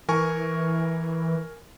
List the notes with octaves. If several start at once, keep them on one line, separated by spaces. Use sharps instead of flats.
E3 A#4 G#5 C#6